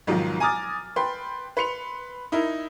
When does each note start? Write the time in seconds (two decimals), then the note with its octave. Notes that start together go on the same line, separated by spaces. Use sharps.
0.07 B1 G#2 D#3 F3 F#3
0.40 G#5 A#5 D6 D#6 F6 A6
0.96 B4 G5 C6
1.57 B4 C6 C#7 F7
2.32 D#4 E4 A#4